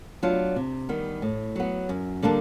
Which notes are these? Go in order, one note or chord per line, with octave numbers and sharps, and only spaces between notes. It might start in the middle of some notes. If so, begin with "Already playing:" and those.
F#3 B3 D4 F4
C3
D#3 G3 B3
A2
F#3 B3
F#2
D3 G3 A#3 D4